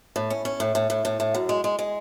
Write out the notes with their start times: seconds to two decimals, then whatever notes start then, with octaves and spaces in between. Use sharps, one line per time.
0.16 A2
0.30 C#4
0.45 C#4
0.60 A2
0.75 A2
0.90 A2
1.05 A2
1.20 A2
1.34 F#2
1.49 G#3
1.64 G#3
1.79 G#3